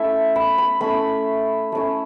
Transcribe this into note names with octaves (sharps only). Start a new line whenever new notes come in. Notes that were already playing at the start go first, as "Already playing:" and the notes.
Already playing: A3 C#4 E4 E5
B5
B5
A3 C#4 E4 B5
A3 C#4 E4